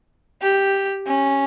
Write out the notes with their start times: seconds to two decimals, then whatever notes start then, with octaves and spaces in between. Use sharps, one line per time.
0.42 G4
1.07 C#4